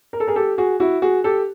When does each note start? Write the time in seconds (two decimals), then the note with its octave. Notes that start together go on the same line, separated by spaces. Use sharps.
0.13 A#4
0.20 A4
0.27 G#4 A#4
0.36 G4 A4
0.58 F#4 G#4
0.80 E4 F#4
1.02 F#4 G#4
1.24 G4 A4